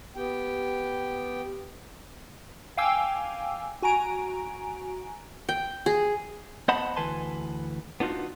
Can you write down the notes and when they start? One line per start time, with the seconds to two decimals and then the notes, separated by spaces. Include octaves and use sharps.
0.16 B3 G4 G5
2.77 F5 G5 G#5 D6 E6
3.82 F#4 G#5 A#5 D7
5.49 G5
5.86 G#4
6.68 B3 C5 D#5 F#5 A5 B5
6.96 D2 E3 B4 G#5 A5 C6
8.00 B3 D4 D#4 F4 F#4